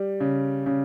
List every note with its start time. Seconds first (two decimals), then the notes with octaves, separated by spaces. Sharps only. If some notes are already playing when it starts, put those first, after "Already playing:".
Already playing: G3
0.20 C#3
0.66 C#3